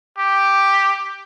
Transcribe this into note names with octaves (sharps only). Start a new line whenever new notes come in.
G4